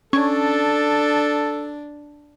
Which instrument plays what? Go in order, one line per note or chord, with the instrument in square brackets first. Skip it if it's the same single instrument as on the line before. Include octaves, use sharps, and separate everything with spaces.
[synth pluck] C#4 [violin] D4 [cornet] A4